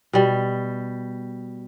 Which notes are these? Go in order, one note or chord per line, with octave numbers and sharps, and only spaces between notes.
B2 G3